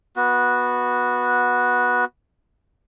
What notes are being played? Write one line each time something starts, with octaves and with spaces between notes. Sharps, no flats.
B3 F#4